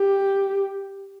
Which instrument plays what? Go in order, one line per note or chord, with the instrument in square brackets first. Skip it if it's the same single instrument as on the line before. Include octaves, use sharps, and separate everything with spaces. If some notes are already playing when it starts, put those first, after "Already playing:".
Already playing: [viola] G4